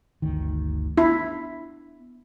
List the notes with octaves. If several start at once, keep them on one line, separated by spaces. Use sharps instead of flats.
G1 D2 D#3
B3 D4 E4